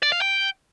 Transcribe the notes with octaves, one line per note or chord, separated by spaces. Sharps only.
D5
F5
G5